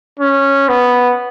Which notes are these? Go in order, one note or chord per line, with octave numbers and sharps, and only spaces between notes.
C#4
B3